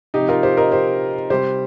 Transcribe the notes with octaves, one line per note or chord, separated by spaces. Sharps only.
C3 F3 D#4 G4
F4 A#4
G4 C5
A#4 D#5
G4 C5
C3 G3 G4 C5